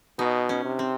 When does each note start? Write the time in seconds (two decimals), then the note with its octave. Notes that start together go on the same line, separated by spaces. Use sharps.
0.19 B2 D#4
0.49 C#4
0.65 C3
0.79 C4